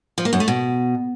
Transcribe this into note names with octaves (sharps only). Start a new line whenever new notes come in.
F3
A#3
F#2
A3
B2